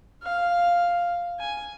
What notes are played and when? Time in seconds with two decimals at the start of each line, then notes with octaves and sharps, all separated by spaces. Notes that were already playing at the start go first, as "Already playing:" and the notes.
0.23 F5
1.39 G#5